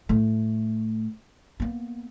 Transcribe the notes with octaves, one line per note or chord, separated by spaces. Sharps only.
A2 A3
A#3 B3